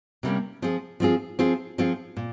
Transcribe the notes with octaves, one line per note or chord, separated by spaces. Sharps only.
C3 G3 A#3 C#4
F3 C4 F4 G#4
F3 C4 F4 G#4
F3 C4 F4 G#4
F3 C4 F4 G#4
A#2